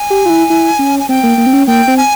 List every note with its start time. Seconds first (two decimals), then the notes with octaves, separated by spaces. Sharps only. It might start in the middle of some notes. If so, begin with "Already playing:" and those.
Already playing: G#5
0.10 G4
0.26 F4
0.29 E4
0.50 E4
0.79 C#4
0.99 G#5
1.09 C4 G5
1.23 A#3
1.38 A#3
1.46 C4
1.53 C#4
1.67 A#3 G5
1.88 C4
1.97 G#5